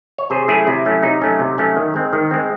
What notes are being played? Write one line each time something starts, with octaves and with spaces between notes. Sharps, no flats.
C#5
C3 G#4 C5
F#3 A3 C#4 E4 G#4
C3 E4
F#3 A3 C#4
C3 D#4
F#3 A3 C#4
C3
F#3 A3 C#4
D#3
G#3 C4
D#3
G#3 C4